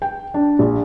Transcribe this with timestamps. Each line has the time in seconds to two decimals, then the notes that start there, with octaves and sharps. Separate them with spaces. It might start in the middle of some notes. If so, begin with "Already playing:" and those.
0.02 G5
0.34 D4
0.59 A#1